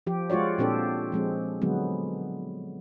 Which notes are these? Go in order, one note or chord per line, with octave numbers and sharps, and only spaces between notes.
F3 G4
G#3 F4 F#4 C#5 D5
A#2 C4 D4 G4 A4 C5
F3 G#3 C4
D3 F#3 G#3 B3